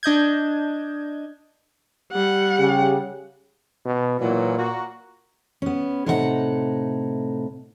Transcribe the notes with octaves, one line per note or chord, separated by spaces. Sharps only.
D4 D#5 G6 G#6
G3 F#5
C#3 G4
B2
A#2 E3 F#3
A#3 F#4
B3 C#4
A2 C3 D#4 A4 C#5 F#5